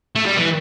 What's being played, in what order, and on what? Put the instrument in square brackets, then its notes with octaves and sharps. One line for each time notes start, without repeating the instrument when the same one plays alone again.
[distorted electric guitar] A3
G3
E3